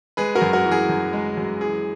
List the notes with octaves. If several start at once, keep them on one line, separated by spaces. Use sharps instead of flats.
G#3 G#4 B4
F#4 A#4
F#2
F#4 A#4
E3
G#4
F#2
G#3
F#2
E3 G#4